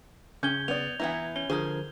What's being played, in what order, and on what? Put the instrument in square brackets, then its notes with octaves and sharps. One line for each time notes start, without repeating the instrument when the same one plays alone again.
[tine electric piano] C#3 [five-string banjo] C#4 [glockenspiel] G6 G#6 G7
[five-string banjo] B3 D5 [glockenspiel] F7
[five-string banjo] E3 B3 E4 [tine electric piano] A#5
[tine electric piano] C#4 [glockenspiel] G7
[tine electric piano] D3 F3 A#4 [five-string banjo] G#4 C5